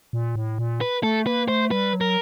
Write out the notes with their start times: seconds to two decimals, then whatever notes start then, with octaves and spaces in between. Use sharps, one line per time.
0.13 A#2
0.36 A2
0.58 A#2
0.81 B4
1.03 A3 A4
1.26 A#3 B4
1.48 A3 C5
1.71 G3 B4
1.93 F#3
2.01 A#4